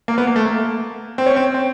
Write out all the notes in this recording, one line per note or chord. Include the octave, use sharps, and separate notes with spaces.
A#3
B3
A#3
A3
A#3
C4
C#4
C4
C4